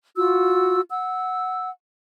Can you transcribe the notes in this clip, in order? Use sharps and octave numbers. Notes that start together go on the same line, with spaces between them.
F4 F#4 E6
F#5 E6